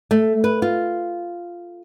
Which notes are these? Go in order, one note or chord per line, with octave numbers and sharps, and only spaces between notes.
A3
B4
F4